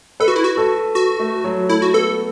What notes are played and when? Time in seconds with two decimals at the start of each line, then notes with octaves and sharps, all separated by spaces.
0.20 A4 B4
0.28 F#4
0.36 E4
0.44 F#4
0.57 A4
0.95 F#4
1.20 A3
1.44 F#3
1.69 A3 E4
1.82 F#4
1.94 B3 A4